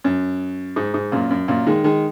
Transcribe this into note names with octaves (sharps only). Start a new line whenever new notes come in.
F#2
G#2
G#2
F#2 A#2
F#2
F#2 A#2
D#3 G#3
D#3 G#3